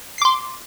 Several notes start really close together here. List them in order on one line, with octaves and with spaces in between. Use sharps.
C7 D6 C6